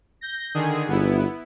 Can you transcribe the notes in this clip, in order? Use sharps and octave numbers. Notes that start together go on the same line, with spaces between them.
G6 A#6
D3 D#3 G#4
G1 B3 E4